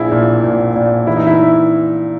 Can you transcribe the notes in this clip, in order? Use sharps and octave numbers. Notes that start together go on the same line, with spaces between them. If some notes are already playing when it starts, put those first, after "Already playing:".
Already playing: A#1 E4 G#4
A#2
A#2
A#2
E3 E4
D#4
E4